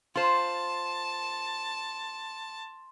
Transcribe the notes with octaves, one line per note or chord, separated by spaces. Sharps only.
F4 C5 A5 C6